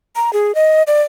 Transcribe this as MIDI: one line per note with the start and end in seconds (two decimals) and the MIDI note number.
0.16 0.33 82
0.33 0.54 68
0.55 0.83 75
0.87 1.02 74